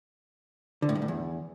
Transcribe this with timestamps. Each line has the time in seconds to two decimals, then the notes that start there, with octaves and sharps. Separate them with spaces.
0.82 D3
0.89 A2
0.95 G2
1.02 A2
1.08 E2